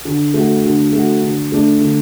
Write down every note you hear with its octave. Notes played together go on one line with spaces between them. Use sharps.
D3
A3 F#4
D3
A3 F#4
D3
A3 D4
D3